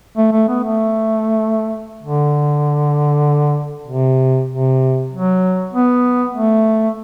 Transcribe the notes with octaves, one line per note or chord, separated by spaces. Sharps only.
A3
A3
B3
A3
D3
C3
C3
F#3
B3
A3